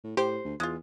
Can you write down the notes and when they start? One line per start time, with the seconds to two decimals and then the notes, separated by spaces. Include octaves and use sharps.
0.04 A2
0.17 A2 G4 C5
0.45 D2
0.60 E2 G#3 F4